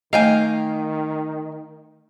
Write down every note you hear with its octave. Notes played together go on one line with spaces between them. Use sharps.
D#3 A3 A#3 D#5 F5 G5 G#5